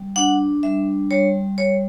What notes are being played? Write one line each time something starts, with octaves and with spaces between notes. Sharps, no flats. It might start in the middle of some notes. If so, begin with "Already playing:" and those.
Already playing: G3
D4 F#5
G3 E5
G3 C#5
G3 C#5